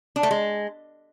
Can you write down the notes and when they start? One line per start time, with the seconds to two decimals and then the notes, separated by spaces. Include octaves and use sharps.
0.16 D4
0.23 A3
0.31 G#3